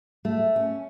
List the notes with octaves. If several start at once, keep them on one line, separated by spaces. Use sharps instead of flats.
A3
C#4